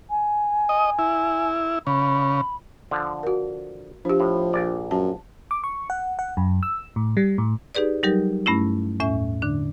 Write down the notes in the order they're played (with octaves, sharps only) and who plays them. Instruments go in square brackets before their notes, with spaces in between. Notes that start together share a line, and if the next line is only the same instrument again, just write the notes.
[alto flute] G#5
[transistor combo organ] D#5
E4
[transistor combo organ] C#3 [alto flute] B5
[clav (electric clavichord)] D3 F3
[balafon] F#4 A#4
[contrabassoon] F3 [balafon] D4 G4
[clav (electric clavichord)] A2
A#1 D5
[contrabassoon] F#2 [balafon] A5
[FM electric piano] D6
C#6
F#5
F#5
F#2
E6
A2
G3
A2
[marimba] D#4 G4 G#4 B4 D5
F#3 G3 D#4 G4 A#4
G2 A3 C#4 E4
E2 A2 C#4 E5
D3 D4